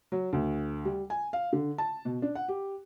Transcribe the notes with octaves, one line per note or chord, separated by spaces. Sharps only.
F#3
D2
G3
G#5
F5
D3
A5
B2
D4
F#5
G4